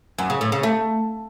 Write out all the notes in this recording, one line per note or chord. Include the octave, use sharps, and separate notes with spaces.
F#2
C#3
A2
C#3
A3